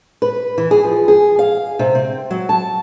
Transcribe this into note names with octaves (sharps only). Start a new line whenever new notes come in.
B4
E3
G#4
F3
G#4
F5
C3
C4
F#3
A5